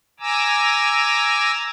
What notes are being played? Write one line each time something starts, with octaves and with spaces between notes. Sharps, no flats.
G#5 A#5 D6 E6